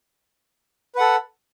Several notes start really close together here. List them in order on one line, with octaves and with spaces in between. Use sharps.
B4 F#5 A4